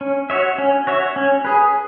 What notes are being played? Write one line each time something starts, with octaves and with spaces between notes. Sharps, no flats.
C#4
F#4 C#5 E5
C#4
F#4 C#5 E5
C#4
G#4 B4